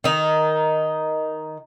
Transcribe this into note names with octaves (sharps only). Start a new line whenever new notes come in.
D#3 D#4